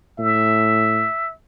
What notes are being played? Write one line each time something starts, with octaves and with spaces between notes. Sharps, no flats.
A2 E5